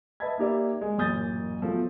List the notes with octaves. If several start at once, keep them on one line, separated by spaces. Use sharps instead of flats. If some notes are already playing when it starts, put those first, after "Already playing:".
B4 D#5 E5 A5 B5 G#6
A#3 D#4 G4 D5 E5
G#3
A1 F#2 A#2 D#6 G6 A6
E2 F3 F#3 A3